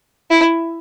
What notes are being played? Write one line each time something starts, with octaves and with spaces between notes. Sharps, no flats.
E4